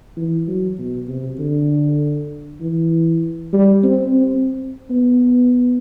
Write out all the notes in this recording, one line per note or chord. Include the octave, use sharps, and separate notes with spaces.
E3
F#3
B2
C3
D3
E3
G3
C4
C4
B3